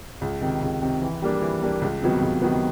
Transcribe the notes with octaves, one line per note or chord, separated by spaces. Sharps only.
C#2
C3 D#3
C#2
C3 D#3
E3
G3 A#3 D4
E3
G3 A#3 D4
C#2
C3 D#3 F#3 B3
C#2
C3 D#3 F#3 B3